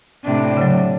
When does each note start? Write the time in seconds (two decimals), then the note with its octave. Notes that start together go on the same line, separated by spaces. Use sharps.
0.24 A2 C3 D4
0.57 C#3 F#3